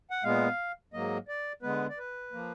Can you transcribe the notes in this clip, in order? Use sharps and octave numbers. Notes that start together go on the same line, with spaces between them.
F#5
A#2 G#3 B3 F5
G#2 F#3 A#3 D#5
D5
D3 G#3 B3 B4
D5
B4
F3 A#3